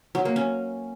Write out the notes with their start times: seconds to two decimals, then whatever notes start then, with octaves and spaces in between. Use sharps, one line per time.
0.15 F#3
0.25 A#3
0.36 C#4